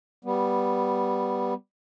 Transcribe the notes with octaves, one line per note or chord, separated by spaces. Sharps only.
G3 B3